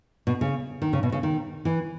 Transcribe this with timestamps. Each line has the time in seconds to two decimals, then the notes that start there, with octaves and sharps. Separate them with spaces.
0.27 B2
0.41 C#3
0.82 D#3
0.93 C#3
1.03 B2
1.12 C#3
1.23 D#3
1.65 E3